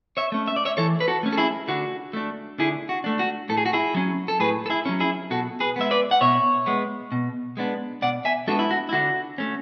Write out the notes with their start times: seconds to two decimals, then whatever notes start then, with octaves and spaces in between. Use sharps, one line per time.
0.17 C#5 E5
0.32 A3 C#4
0.48 E5
0.56 D5
0.65 C#5 E5
0.77 E3 A4 C#5
1.01 B4
1.08 F#4 A4
1.23 A3 C#4
1.33 A4
1.37 E4 G#4
1.68 D3 F#4
2.13 A3 D4
2.59 D3 E4 G#4
2.89 F#4
3.04 A3 D4
3.19 F#4
3.49 A2 A4
3.57 G#4
3.66 F#4
3.73 E4 G#4
3.94 F#3 C#4
4.28 A4
4.40 A2 G#4 B4
4.66 A4
4.70 E4 G#4
4.86 F#3 C#4
5.00 E4 G#4
5.30 B2 F#4 A4
5.60 G#4 B4
5.76 G#3 B3 E5
5.91 B4 D5
6.11 F#5
6.21 B2 C#5 E5
6.66 G#3 B3
7.12 B2
7.57 G#3 B3 D4
8.02 B2 D5 F#5
8.25 E5 G#5
8.47 G#3 B3 D4 F#4 A4
8.59 E4
8.71 F#4
8.89 E4
8.93 D3 F#4
9.38 A3 C#4